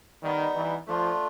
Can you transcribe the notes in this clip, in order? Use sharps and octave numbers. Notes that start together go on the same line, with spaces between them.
D#3 G3 B3 D#4
E3
F3 A3 D4 F4